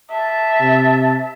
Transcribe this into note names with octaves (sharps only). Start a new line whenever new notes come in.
E5 A5
C3